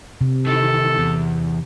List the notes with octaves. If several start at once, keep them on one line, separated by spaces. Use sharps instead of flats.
C3
D#3 E3 A4
E2